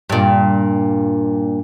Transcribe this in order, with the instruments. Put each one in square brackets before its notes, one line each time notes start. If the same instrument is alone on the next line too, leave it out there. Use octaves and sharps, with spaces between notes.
[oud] G2 A#2